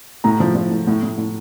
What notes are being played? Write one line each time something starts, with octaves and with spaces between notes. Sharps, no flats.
A2 A#5
F3
F3
A2
A2
A2
A2